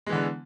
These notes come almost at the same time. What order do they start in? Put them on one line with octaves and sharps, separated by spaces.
G#3 E3 D3 B3